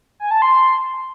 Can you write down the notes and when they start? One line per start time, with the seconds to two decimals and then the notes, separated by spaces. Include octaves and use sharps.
0.20 G#5
0.31 A5
0.42 C6